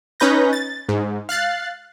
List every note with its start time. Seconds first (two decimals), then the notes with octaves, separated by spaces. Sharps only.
0.20 C#4 D#4 B4 G6 A#6
0.53 A6
0.89 G#2
1.29 F5 F#6 A6 C7